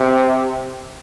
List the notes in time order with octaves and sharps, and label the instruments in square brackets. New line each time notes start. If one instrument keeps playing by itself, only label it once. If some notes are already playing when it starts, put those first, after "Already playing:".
Already playing: [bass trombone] C3